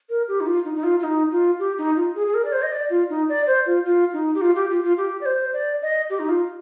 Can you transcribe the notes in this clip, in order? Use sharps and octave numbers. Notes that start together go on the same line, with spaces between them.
A#4
G4
D#4
F4
D#4
D#4
F4
F4
D#4
F4
G4
D#4
F4
G#4
G#4
A#4
D5
C5
D#5
D5
F4
D#4
D5
C5
F4
F4
D#4
G4
F4
G4
F4
F4
G4
D5
C5
D5
D#5
G4
D#4
F4